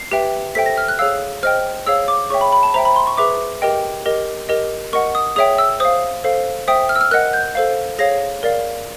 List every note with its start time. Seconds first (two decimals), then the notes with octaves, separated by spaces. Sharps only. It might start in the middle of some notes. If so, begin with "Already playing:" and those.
Already playing: C7
0.11 G4 B4 E5 G5
0.55 A4 C5 E5 G5 B6
0.66 A#6
0.78 F6
0.88 F#6
0.99 G#4 C#5 F5 E6
1.43 C5 D#5 G5 F6
1.87 G#4 C#5 F5 E6
2.08 D6
2.30 G#4 C#5 E5 G5 C#6
2.41 B5
2.53 B5
2.63 A5
2.74 C5 E5 G5 A#5
2.85 B5
2.96 C6
3.07 C#6
3.17 G#4 B4 E5 D6
3.62 G4 A#4 D#5 G5
4.06 G4 A#4 D#5
4.49 G4 A#4 D#5
4.93 A#4 D#5 F#5 C#6
5.15 D#6
5.36 G#4 C#5 E5 G5 D#6
5.58 E6
5.80 C5 F5 D#6
6.24 A4 C5 F5
6.68 C5 E5 G5 D#6
6.89 F6
6.96 E6
7.01 F6
7.11 A#4 D#5 F#5 F#6
7.33 G6
7.55 A4 C5 F5
7.99 G#4 C#5 F5 A#6
8.43 A#4 D5 F5